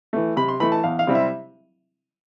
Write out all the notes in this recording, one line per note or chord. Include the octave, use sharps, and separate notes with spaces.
E3 A3
C3 B5
C6
E3 A3 B5
A5
E2 F5
F5
C3 G3 C4 E4
E5